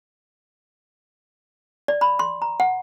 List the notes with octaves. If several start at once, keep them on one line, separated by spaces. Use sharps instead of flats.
D5
B5
C6
A#5
F#5